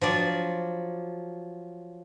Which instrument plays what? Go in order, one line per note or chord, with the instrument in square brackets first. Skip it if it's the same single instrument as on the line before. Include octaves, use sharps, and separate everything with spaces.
[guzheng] F3 F#3 D5